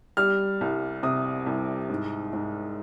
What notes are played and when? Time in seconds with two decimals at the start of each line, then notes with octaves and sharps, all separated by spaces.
0.17 G3 F6
0.61 C2
1.03 C3 D#6
1.46 C2
1.89 G#2
2.33 G#2